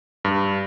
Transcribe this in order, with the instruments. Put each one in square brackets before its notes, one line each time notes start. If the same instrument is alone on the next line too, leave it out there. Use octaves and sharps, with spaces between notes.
[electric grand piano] G2